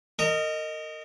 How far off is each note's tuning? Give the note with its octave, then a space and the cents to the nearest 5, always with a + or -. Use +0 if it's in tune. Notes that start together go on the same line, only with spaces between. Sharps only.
A#4 -30 D#5 +0